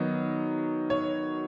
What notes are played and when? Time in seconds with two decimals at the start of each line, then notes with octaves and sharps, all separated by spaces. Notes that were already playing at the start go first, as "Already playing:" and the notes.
Already playing: D#3 F#3 B3 D#4
0.90 C#5